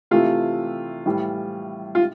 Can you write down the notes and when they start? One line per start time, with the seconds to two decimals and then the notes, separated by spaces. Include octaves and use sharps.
0.11 C3 E3 A3 F4
1.06 A2 E3 G3
1.95 F4